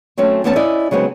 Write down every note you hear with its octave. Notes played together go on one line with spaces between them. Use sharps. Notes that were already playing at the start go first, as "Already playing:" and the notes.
F#3 A3 C4 C#4
E2 A3 B3 C#4 C5 A5
C#4 E4 D5 D#5
C#3 F#3 G#3 B3 C4